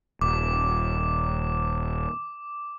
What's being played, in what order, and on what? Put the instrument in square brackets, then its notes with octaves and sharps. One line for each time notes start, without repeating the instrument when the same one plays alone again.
[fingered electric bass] D#1 [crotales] D6